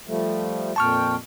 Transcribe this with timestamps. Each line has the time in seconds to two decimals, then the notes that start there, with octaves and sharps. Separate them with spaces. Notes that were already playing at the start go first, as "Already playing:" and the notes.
0.07 F3 G3 A3
0.76 F2 A#2 G5 A5 C#6 F6